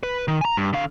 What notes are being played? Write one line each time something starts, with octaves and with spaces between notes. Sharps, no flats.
B4
D#3
G#5 A#5
G2
D3 F5